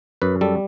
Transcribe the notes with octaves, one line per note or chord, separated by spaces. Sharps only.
F#2 B4
G3 A4